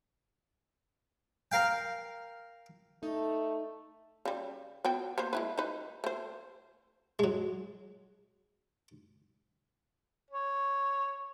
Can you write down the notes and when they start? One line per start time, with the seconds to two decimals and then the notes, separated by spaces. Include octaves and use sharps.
1.52 A#4 F5 G5
3.03 A3 D#4 A4
4.25 C#3 G3
4.85 B3 F#4 G5
5.18 A#3 B3 C5
5.33 G#3 E4 B4
5.58 D#4 B4
6.04 A3 C5
7.19 F#3 G#3
10.31 C#5